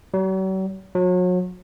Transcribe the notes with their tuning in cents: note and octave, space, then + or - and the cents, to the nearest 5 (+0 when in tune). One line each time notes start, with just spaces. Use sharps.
F#3 +45
F#3 -35